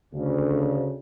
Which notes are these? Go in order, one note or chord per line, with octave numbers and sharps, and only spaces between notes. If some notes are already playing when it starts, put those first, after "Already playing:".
D2 C#3